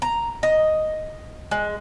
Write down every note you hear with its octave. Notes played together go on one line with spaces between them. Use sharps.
A#5
D#5
G#3